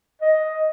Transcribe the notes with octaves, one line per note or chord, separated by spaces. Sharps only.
D#5